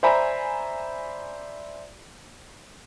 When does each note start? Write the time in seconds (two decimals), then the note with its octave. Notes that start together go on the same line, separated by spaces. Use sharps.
0.03 C5 D5 E5 G#5 A#5 B5